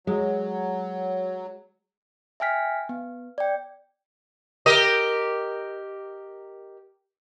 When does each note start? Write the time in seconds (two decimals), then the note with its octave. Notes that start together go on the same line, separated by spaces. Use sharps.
0.07 F#3 G#3
2.40 E5 G5 G#5 F6 B6
2.89 B3
3.38 D5 G5
4.66 G4 A#4 D#5